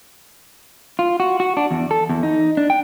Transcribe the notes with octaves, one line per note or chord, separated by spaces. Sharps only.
F4
F#4
F#4
D4
E2
A4
E2
D#4
D4
G5